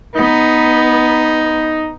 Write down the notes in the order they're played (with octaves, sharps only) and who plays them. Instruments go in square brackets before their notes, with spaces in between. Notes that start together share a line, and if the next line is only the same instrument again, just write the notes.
[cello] B3 [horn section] D#4